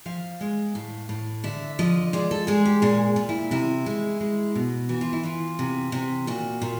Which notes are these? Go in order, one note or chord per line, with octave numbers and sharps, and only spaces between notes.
F3 F5
G#3
A2
A2
D3 E5
F3 D#5
G#3 D5
A4
G#3 G#4
G4
A#2 G#4
A#2
E4
C3 E4
G#3
G#3
B2
E3 F#4
F4
E4
E3 F4
C3
C3
A#2 F#4
A#2